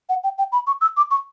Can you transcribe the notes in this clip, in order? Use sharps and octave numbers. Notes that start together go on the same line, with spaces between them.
F#5
G5
G5
B5
C#6
E6
D6
C#6